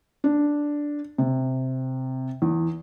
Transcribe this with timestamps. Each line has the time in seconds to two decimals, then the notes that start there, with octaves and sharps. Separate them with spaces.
0.24 D4
1.18 C3
2.42 E2